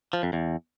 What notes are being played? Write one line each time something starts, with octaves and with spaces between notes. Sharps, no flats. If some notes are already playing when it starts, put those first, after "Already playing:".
F3
F2
E2